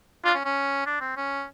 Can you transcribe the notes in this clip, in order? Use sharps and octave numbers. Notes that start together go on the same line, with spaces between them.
D4 F4
C#4
C#4
D4
C4
C#4